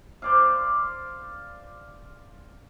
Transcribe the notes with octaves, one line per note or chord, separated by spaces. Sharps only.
C5 D5 F5